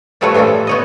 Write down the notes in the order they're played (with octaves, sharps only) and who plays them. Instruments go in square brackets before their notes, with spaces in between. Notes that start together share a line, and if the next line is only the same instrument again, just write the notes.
[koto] A#2 F3 G3 A3 B4 C#5
A2 E3 G3 F4 A4
B3 C#5 D#5